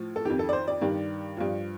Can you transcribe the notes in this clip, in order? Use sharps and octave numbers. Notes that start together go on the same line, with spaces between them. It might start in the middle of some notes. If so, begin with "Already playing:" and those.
Already playing: A2 F3
A4
F2 D#3 G4
A4
D5
C5
D5
G2 D#3
G2 F3